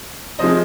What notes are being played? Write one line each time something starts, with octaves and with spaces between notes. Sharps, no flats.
C3 F3 G#3 C5 D#5